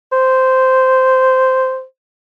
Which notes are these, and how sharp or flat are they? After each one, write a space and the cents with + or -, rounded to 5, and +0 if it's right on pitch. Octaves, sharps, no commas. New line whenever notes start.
C5 -10